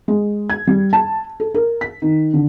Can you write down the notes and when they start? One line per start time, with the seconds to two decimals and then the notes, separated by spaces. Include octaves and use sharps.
0.08 G#3
0.50 G#6
0.67 G3
0.93 A5
1.40 A4
1.54 A#4
1.81 B6
2.02 D#3
2.33 D3